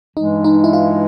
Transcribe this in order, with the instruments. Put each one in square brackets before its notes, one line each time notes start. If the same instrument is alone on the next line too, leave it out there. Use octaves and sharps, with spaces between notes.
[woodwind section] G2 E3 G#3 [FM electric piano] D#4
[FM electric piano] D#4
E4
F4